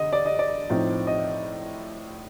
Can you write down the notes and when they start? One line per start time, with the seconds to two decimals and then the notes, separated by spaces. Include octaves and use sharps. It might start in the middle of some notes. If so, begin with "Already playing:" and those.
Already playing: D3 D#5
0.13 D5
0.26 D#5
0.39 D5
0.70 A2 F3 C4 D#4
1.07 D#5